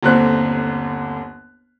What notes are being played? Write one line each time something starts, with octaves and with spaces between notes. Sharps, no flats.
G1 D#2 D3 C4 F#6